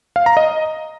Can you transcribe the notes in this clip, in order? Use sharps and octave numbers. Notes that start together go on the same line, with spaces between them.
F5
A#5
D#5